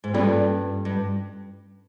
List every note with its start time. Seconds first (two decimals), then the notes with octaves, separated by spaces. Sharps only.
0.04 G#2
0.14 G2 A#3 C#4 F4 A4 D5
0.85 G2